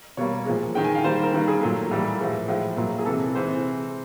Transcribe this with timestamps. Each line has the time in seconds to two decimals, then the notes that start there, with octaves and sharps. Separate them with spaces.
0.17 B2 G3 A#3 C#5
0.46 A#2 F3 G#3
0.75 D#3 G#3 G5
0.84 G#5
0.95 F5
1.04 D#3 G3 A#3 C5
1.23 A#4
1.33 D#3 G3 A#3 B4
1.48 G#4
1.61 A#2 F#3 A3
1.91 A2 E3 G3 A#3
2.19 A2 F3 G#3
2.48 A2 F3 G#3
2.77 A#2 F#3 A#3
2.99 G#4
3.05 C3 E3 G#3 A4
3.34 C3 E3 G#3 C5